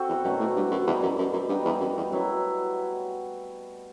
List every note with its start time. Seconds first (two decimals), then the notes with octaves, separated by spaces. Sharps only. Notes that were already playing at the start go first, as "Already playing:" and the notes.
Already playing: C4 F#4 A4
0.09 E2
0.24 F#2 B2 F#3 A3
0.40 A2
0.56 G2
0.71 F#2
0.87 E2 E3 G3 D#4
1.02 F#2
1.19 F#2
1.34 F#2
1.49 G2 G3 B3 D#4
1.65 E2
1.81 F#2
1.97 E2
2.12 F#2 F#3 B3 E4